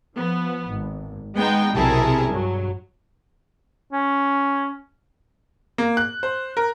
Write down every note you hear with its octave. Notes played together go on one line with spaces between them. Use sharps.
F3 B3
G#1
G#3 B3 D#4 G5
B1 C3 E4 G#4 A#4 A5
G2 F#3
C#4
A#3
F#6
C5
A#4